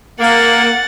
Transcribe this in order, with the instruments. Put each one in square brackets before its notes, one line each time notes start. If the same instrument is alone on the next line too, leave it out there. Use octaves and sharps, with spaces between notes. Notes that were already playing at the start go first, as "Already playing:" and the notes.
[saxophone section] A#3 [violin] F#5 A6